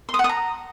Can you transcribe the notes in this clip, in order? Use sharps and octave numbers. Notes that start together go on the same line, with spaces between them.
C6
D#6
F#5
D#6
A#5